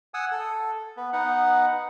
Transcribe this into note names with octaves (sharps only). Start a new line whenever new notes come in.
F#5 G#5 D#6 E6
A4
B3
B3 D#4 F#5